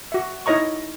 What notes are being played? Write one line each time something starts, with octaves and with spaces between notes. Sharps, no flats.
F#4 E5
D#4 E4 C#5 D#5 A#5 C#6